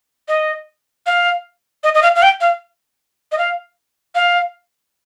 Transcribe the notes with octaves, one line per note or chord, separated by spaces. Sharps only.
D#5
F5
D#5
D#5
F5
F5
G5
F5
D#5
F5
F5